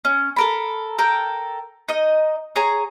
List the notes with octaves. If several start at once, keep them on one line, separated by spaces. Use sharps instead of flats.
C#4
A4 A#4 B5
A4 A#4 G5
D#4 D#5
G#4 C#5 A#5